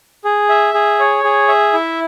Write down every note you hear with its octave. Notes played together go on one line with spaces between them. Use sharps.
G#4
E5
G#4
C#5
G#4
E5
E4